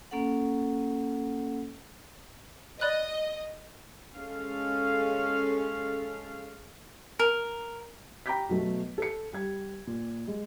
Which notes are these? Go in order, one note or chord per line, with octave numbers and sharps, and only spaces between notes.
A#3 C#4 A4 F#5
D5 D#5 B5 F#6
G#3 C#4 A4 F5
A#4
G5 A#5 B5 D6 G6 B6
B2 F#3 A3 B3
A4 C#7
G3 G4 G#6
A#2
G#3